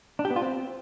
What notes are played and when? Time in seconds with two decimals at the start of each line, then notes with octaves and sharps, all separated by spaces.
0.19 D4
0.25 G4
0.30 B3
0.36 F4
0.42 C4